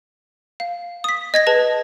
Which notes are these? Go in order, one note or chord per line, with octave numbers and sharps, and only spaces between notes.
F5
D#6 B6
D#5 G#6 A#6
G#4 B4 A5